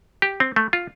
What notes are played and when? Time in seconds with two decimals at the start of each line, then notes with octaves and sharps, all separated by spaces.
0.22 G4
0.40 C4
0.56 A3
0.73 F4